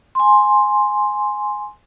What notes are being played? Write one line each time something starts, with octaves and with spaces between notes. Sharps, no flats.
G#5 C6